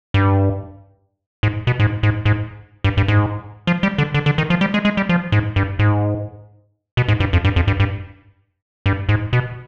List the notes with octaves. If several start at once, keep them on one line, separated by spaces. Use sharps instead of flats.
G2
G#2
B2
G#2
G#2
G#2
G2
G2
G#2
F3
G3
D3
D3
D3
D#3
F3
G3
G#3
G#3
G3
F3
G#2
G2
G#2
B2
G#2
G2
F2
G2
F2
G2
G2
G2
G#2
B2